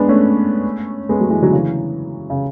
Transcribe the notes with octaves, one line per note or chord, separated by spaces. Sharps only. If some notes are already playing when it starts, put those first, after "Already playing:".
Already playing: G#3 B3 D4
A3 C#4
G#3 B3
F#3 A3
E3 G#3
D3 F#3
C#3 E3
C#3